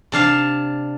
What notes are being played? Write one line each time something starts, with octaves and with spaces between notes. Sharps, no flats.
C3 D4 F5 A5